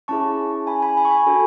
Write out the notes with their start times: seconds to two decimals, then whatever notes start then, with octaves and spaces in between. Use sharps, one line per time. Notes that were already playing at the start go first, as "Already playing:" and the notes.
0.08 C#4 E4 G#4 A5 C#6
0.67 G#5 B5
0.82 G#5 B5
0.97 G#5 B5
1.05 C#6
1.11 G#5 B5
1.27 D4 F#4 A4